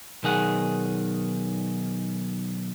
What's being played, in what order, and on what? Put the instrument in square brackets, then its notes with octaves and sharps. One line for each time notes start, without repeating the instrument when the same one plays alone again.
[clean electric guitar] B1 D#3 G#4 F#5